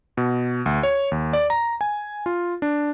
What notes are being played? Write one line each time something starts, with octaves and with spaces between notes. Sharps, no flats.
B2
D2
C#5
D#2
D5
A#5
G#5
F4
D4